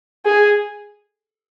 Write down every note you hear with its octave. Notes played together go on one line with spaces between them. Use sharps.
G#4